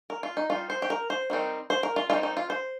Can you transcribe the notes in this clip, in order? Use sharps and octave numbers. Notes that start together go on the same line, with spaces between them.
A#4
F4
D#4
G3 D#4 F4
C5
G4
A#4
C5
D#3 G3 C4 D#4
C5
A#4
F4
D#3 G3 C4 D#4 F4
D#4
F4
C5